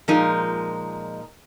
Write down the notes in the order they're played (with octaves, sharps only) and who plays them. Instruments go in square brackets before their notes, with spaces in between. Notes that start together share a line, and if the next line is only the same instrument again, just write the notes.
[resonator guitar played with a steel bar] A#2 F3 G#3 D#4 A#4